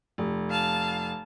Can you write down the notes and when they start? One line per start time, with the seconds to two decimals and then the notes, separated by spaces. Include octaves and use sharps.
0.18 F1
0.51 F5 A5